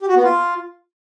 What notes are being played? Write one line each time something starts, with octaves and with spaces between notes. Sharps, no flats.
G4
F#4
B3
F4